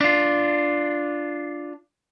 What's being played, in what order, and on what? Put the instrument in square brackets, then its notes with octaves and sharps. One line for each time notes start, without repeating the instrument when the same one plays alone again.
[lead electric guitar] D4 F4